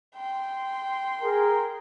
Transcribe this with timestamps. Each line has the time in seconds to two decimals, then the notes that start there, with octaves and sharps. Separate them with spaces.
0.15 G5 C6
1.22 G#4 A#4